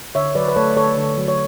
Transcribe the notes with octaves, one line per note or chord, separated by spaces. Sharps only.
D3 C#5 E5
F#3 B4 D5
B4
A3 A4 C#5
D3 A4 C#5
D3
F#3
C#5